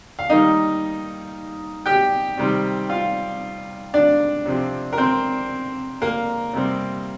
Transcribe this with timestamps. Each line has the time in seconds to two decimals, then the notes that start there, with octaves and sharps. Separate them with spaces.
0.19 F5
0.29 D#3 G3 A#3 D#4 D#5
1.86 G4 G5
2.37 C3 D#3 G3 C4
2.89 F4 F5
3.94 D4 D5
4.46 C3 F3 C4
4.93 A#4
4.98 C4 C5
6.02 A#3 A#4
6.54 C3 G3 C4